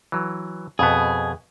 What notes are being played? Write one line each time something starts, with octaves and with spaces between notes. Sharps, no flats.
E3 F#3
F2 B2 B3 G#4